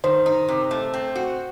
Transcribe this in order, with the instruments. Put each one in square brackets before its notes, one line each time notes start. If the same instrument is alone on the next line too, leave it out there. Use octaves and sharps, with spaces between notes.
[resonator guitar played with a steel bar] D#3 [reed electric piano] C5
[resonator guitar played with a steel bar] D#4
C3
A3
C4
F#4